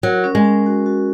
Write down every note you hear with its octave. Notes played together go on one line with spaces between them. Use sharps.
F#3 A#4
C#4
G#3
C#4
F#4
F#4